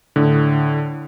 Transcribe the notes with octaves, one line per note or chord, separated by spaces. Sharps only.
A2 D3